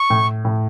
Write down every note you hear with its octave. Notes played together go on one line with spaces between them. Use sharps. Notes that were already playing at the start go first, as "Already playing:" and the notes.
Already playing: C#6
A2
A2